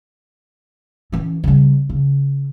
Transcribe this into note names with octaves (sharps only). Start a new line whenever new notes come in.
E3 C#4
C#3 G3
C#3